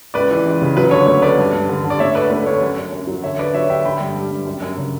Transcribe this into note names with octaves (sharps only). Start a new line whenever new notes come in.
C#2 B4 D5
E3
C#2
C#3
F#3 B4
D3 C#5
A3 C#5
D2 B4 D5
G2
G2
D3
D3
D5
A3 C#5 E5
D2 B4 D5
A3 B4
D2 C#5
F#2
F#2
F#2
F#3
D3 C#5 E5
D3 B4 D5
F#3 C#5 E5
D3 E5 G5
D3 G5 B5
G2
G3
G2
F#2
F#2
C#3